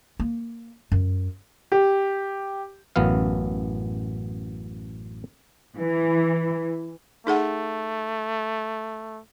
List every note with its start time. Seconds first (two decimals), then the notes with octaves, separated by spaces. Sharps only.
0.19 A#3
0.92 F#2
1.72 G4
2.96 A1 F#2 B3 F5
5.78 E3
7.27 A3 D#4 G#4 F#5